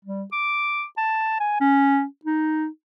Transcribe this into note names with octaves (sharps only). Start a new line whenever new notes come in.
G3
D6
A5
G#5
C#4
D#4